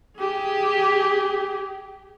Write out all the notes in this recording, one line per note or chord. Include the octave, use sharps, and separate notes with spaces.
G4 G#4